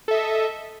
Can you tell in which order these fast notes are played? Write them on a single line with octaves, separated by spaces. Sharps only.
A4 E5 D#5